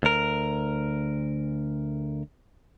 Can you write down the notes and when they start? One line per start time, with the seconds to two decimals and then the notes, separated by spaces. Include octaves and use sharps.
0.03 D2 A#4